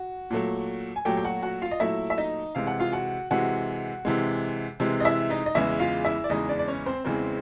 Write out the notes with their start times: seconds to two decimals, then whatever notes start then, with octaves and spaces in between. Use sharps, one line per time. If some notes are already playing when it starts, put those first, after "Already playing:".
Already playing: F#4
0.30 A#2 F#3 A3
0.96 G#5
1.05 A#2 F#3 A3 G4 G5
1.17 G5
1.24 F#4 F#5
1.42 F#4 F#5
1.62 F4 F5
1.71 D#5
1.80 A#2 F#3 A3 E4 E5
2.10 E5
2.18 D#4 D#5
2.55 C3 E3 G#3 F5
2.67 F#5
2.80 F4 F5
2.93 F#4 F#5
3.31 C3 E3 G#3 F#4 F#5
4.05 C3 E3 G#3
4.80 C3 E3 G#3
5.00 D#5
5.05 E4 E5
5.30 D#4 D#5
5.46 D#5
5.55 E2 C#3 E3 G#3 E4 E5
5.80 F4 F5
6.05 E4 E5
6.24 D5
6.29 E2 C#3 E3 G#3 D#4 D#5
6.49 D4 D5
6.59 D5
6.68 C#4 C#5
6.86 C4 C5
7.04 E2 C#3 E3 G#3 C4 C5